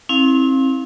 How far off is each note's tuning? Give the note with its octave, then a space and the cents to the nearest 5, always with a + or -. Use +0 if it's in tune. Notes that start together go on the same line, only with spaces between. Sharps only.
C4 +30 E4 -30 F5 +0